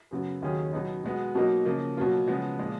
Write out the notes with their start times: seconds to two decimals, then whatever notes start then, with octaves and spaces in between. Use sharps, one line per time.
0.11 F#2 C#3 F#3 B3
0.42 D#2 D#3 F#3 C#4 G#4
0.73 B2 F#3 B3 D#4
1.04 B2 G#3 B3
1.35 B2 F#3 A#3 D#4
1.65 C#3 F3 A#3
1.97 B2 F#3 A#3 F4
2.27 C#3 F3 G#3 B3
2.59 A#2 F3 G#3